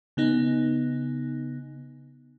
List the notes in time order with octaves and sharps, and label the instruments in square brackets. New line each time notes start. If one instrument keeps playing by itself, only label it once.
[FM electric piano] C#3 B3 D#4